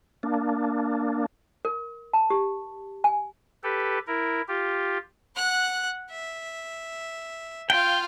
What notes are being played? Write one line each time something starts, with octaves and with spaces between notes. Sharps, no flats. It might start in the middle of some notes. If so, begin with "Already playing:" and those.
A#3 D4
A#4
A5
G4
G#5
G4 A4 B4
E4 A#4
F4 G4
F#5 F#6
E5
F4 F5 G5